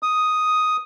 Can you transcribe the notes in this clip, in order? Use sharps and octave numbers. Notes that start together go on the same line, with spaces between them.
D#6